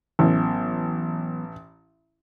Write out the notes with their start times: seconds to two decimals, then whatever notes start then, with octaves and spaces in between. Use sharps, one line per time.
0.19 A1 E3 F#3 B3